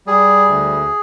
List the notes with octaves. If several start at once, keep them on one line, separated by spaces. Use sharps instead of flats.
G3 G#4
D2